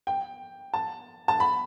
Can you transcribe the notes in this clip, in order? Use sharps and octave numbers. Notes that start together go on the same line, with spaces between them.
G5
A5
A5
B5